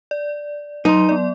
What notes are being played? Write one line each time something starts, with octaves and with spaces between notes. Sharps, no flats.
D5
F#3 D#4 C6
B3 D5